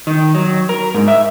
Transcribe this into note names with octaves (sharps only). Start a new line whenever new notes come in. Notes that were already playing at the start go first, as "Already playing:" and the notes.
D#3
F#3
A#4
G#2
E5